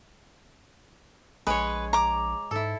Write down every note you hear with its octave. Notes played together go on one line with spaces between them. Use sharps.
A#1 G#3 B4 C#5
A#5 D6
G#2 E4 A4